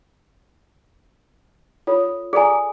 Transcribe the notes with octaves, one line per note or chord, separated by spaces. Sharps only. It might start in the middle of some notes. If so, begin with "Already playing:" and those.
F4 A4 C#5
G#4 A4 D5 G#5 A#5